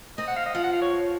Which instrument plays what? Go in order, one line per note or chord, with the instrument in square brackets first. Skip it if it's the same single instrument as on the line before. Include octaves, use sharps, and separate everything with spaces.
[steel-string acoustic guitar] C4 [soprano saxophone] D#5
[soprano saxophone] F#5
F5
D#5
[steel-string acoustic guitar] F3 [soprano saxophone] F5
[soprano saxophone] F#5
F5
C#5